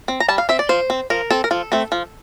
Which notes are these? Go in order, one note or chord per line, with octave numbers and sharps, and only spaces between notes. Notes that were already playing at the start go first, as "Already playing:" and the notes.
C4
A#5
G3 A5
F5
C4 E5
D5
F3 C5
C4
F3 A#4
C4 A4
A#4
F3 A4
A3 C4
F3